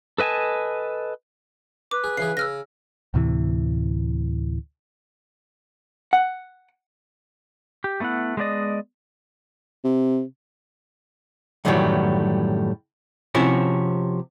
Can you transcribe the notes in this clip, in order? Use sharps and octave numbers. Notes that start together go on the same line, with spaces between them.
A4 B4 D#5 G#5 A5
B4 D6
G#4
C#3 E3 G#4 C7
C#3 E6 F6 A#6
D2 A2 C3 E3
F#5
G4
A3 B3 D#4 E4 F#5
G#3 B3 D4 G4 D5 D#5
C3
F#2 A2 D#3 E3 F#3 G3
C3 F3 C#4 E4 F#4